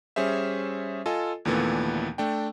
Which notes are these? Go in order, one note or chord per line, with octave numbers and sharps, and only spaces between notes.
G3 C#4 G#4 C5 E5
F4 A4 D#5 G#5
D#2 A#2 D3 E3 A3 B3
A3 D4 G5